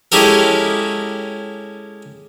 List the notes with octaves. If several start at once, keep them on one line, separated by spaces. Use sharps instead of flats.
G#3 C#4 E4 G4 A4 A#4